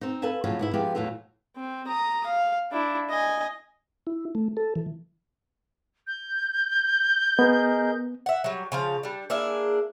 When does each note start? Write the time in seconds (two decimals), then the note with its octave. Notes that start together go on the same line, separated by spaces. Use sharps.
0.01 C4 D#4
0.22 A4 B4 F5 G#5 A5
0.44 A2 C#3 F3 F#3 F4
0.59 G#2 B3 E4
0.73 F3 G#3 B3 F4 G4
0.95 E2 A2 F#3 F4 A4
1.56 C4
1.87 A#5 D#6
2.26 F5
2.72 D4 E4
3.10 D#5 G#5
4.07 E4
4.35 A3
4.57 A4
4.76 E3
6.07 G6
7.39 B3 G#4 A#4 D#5
8.26 E5 F#5
8.44 F#3 G3
8.72 C#3 F3 F5
9.03 G3 D4
9.30 A#3 D4 E4 G#4